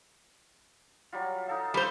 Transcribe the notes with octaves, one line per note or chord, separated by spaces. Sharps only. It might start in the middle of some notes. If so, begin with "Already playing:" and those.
F#3 G3 F4
D#4 A4 F5
G3 C5